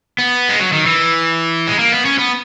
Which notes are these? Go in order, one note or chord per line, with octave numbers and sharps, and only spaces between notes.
B3
G#3
F#3
D#3
E3
G#3
A#3
B3
C#4
B3